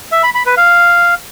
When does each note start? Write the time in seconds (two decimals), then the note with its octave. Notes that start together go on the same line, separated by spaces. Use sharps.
0.12 E5
0.23 B5
0.35 B5
0.46 B4
0.57 F5